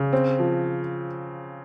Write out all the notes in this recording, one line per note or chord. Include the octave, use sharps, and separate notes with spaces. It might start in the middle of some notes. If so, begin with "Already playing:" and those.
Already playing: C#3
C4
F3